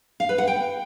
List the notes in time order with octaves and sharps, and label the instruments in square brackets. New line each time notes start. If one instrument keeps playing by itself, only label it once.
[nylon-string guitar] F5
B4
F#5
G5